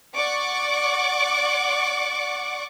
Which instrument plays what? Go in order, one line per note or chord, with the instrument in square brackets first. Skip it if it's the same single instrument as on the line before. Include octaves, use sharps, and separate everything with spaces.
[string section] D5 F#5 C#6 D6